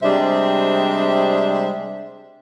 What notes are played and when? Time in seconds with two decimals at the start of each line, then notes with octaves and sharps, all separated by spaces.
0.02 C3 G3 G#3 D4 C5 E5